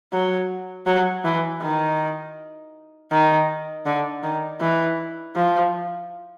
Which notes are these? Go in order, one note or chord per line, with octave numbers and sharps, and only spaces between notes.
F#3
F#3
E3
D#3
D#3
D3
D#3
E3
F3